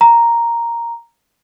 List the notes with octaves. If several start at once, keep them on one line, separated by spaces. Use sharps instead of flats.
A#5